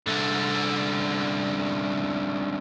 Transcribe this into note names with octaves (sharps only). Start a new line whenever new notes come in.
C2 D3